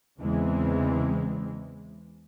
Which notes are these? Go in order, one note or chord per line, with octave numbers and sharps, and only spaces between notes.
E2 C#3 E3 G#3 C4